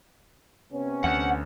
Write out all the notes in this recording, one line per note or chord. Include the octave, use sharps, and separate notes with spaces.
C3 B3 C#4
D2 F#5